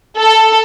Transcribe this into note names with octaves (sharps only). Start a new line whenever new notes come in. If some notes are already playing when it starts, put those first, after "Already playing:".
A4